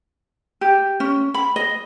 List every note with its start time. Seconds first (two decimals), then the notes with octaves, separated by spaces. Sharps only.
0.61 G4
1.00 C#4
1.34 B5
1.56 D#5